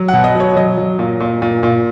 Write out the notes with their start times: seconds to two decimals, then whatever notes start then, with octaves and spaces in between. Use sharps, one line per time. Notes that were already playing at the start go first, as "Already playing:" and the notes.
Already playing: F#3
0.08 B2 F#5
0.24 D#5
0.35 F#3 C#5
0.56 F#3 D#5
0.78 F#3
0.99 A#2
1.20 A#2
1.42 A#2
1.63 A#2